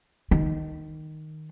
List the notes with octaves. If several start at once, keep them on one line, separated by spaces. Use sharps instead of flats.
D#3